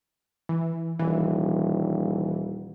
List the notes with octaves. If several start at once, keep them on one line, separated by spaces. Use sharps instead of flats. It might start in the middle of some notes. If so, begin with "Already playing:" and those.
E3
D#1 E3